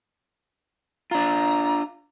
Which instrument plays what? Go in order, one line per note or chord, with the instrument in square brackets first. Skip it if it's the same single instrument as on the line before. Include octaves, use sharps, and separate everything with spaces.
[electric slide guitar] D4 F4 [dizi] A#5